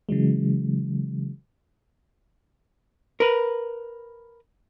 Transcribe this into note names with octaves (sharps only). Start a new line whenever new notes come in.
C#3 E3 F#3 G#3
A#4 B4